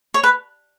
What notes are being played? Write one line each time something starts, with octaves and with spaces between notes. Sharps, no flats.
C#5
B4